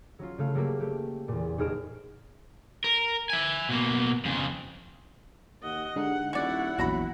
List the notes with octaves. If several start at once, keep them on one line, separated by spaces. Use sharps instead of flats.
F#3 C#4 F4
C#3 A3 F5
F#3 G3 A3 A#3
A3 G4
E2 A#2
F1 D#4 G#4 F6 D7 E7
A#4
E5 G#5
B2 A#3
F2 C#3
D#2 D#5 F#5
G2 D3 G#3 D#4 F#5
D#1 C#4 E4 D5 F#5 C#6
A#1 E2 F#3 F#4 A#5 B5